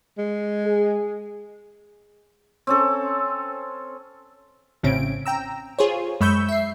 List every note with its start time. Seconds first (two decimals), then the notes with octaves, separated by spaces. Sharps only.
0.18 G#3
0.65 G#4
2.67 C4 C#4 A4
4.83 A1 A2 C#3 C4 C#4 D7
5.26 G5 A#5 E6
5.79 F4 G#4 C5 C#5
6.21 F#2 G#3 B5 C#6 E6 G6
6.48 E5 C7